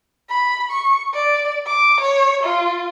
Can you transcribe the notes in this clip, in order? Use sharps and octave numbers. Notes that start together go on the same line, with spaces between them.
B5
C#6
D5
D6
C#5
F4